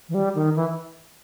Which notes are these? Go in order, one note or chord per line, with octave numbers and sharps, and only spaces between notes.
E3
G3
D#3
E3